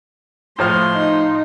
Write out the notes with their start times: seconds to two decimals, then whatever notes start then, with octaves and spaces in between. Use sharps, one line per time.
0.59 A2 F3 C6 F6
0.94 D#4